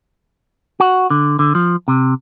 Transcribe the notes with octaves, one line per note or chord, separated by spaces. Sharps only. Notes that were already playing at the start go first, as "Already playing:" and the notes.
F#4
D3
D3
F3
C3